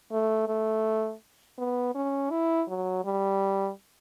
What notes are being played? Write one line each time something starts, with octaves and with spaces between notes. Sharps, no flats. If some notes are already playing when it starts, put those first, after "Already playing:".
A3
A3
B3
C#4
E4
F#3
G3